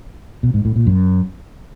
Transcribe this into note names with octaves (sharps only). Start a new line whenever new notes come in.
B2
G#2
A2
A#2
F#2